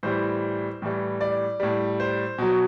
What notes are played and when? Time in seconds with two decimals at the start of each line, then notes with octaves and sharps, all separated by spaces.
0.03 A2 E3 G3 C5
0.82 A2 E3 G3
1.21 D5
1.60 A2 G3
2.00 C5
2.38 B2 F#3